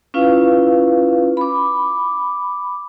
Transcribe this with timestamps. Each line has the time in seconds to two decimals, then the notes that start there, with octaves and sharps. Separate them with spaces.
0.14 C#4 E4 F4 B4 F5
1.37 B5 D6